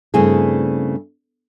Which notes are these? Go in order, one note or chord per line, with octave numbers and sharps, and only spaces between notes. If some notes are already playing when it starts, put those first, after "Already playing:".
G2 C#3 A3 C4 E4 G#4